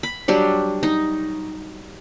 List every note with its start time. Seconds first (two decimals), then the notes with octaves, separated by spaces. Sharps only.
0.03 B5
0.28 F#3 G3 D4
0.83 D#4